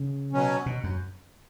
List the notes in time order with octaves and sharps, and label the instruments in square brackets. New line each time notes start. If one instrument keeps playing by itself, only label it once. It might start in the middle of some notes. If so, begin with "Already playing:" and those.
Already playing: [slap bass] C#3
[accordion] B2 F#3 C#4
[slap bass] B2
F#2